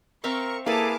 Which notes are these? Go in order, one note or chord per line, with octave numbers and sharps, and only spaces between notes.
C4 A#4 E5 F5 C#6
A#3 E4 G#4 A4 B4 F5 A5 D6